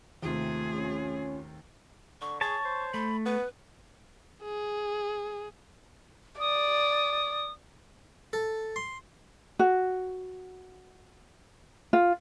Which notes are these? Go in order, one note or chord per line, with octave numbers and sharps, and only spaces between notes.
D#2 C3 A3 F4 G#4
C#4
D3 C#6
G#4 C#5 A5 C#6
C5
A3 B5
B3 B4
G#4
D5 D#6
A4
C6
F#4
F4